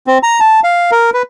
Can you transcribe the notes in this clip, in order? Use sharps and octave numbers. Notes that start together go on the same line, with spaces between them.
C4
A#5
A5
F5
A#4
B4